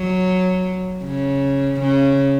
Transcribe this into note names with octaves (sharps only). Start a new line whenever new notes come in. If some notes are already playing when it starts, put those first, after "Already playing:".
Already playing: F#3
C#3
C#3